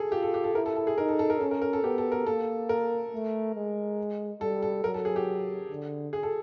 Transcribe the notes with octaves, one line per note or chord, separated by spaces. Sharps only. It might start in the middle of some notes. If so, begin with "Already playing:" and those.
Already playing: G#4 A4
F4 G4
A4
G4
A4
E4 A#4
A4
A4
G#4
D#4 A#4
A4
A4
A#4
C#4 A4
A#4
A#4
A4
B3 G4
A4
A#4
A#3 A4
A#4
A3
G#3
G3 A4
A4
F#3 A#4
A4
G#4
G4
D3
G#4
A4